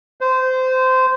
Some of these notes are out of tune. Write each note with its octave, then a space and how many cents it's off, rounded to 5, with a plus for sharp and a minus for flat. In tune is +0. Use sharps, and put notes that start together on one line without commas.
C5 -20